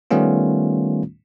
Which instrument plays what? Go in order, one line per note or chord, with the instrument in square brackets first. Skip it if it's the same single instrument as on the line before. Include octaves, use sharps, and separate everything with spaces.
[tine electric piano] D#3 G3 A3 B3 C#4 F4